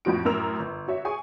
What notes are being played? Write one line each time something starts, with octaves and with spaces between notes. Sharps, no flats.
F2 A2 F3 F#4 D7
F#2 A2 A#4 E6 F7
G1
F#4 C#5 E5
G#4 G#5 C#6